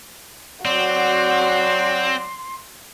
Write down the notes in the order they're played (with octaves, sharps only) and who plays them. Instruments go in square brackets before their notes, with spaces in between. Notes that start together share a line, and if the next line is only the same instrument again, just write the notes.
[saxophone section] F#3 D5 [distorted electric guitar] C4 [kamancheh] F#4 [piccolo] C6